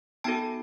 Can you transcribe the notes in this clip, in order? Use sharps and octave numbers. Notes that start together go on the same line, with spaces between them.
B3 D#4 F#4 A4 G5 A5